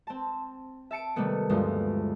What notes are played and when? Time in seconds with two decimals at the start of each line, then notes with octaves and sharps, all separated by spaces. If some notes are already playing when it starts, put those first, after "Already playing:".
0.07 C4 A5
0.91 E5 A5 C#7 D7
1.16 C3 D#3 G3 A3 B3
1.50 D2 G2 F3 G#3